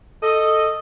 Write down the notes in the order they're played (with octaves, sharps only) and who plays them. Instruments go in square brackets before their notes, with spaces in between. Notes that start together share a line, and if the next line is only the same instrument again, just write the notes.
[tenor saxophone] A4 [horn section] D#5